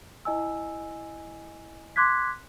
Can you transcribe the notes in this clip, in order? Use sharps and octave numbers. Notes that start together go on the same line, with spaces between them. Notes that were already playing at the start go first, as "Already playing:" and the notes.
E4 D#5 G#5 E6
C6 D6 F#6 G#6 B6